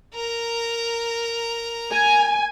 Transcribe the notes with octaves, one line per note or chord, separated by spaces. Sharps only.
A#4 A#5
G#5